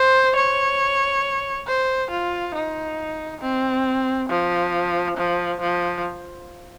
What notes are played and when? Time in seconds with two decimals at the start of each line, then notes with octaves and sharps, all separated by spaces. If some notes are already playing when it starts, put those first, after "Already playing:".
Already playing: C5
0.36 C#5
1.67 C5
2.11 F4
2.55 D#4
3.42 C4
4.29 F3
5.17 F3
5.61 F3